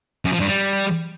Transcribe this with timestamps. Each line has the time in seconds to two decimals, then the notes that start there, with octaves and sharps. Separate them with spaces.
0.25 F#2
0.33 F3
0.40 G2
0.48 G3